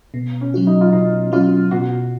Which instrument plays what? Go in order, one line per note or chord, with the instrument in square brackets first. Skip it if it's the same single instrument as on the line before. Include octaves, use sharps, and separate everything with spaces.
[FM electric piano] B2
[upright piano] C#4
[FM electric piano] F#3 C#4 F#4
[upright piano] D#4
F4
[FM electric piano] B2 [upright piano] D#4
[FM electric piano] F#3 C#4 F#4 [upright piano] F4
[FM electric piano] B2 [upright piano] F#4